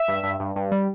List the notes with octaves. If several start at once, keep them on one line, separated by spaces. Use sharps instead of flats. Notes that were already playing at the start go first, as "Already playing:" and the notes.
Already playing: E5
G2
G2
G2
G2
G3